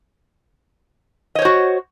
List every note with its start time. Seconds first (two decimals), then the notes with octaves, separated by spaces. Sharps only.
1.35 D#5
1.39 C#5
1.42 C5
1.45 F#4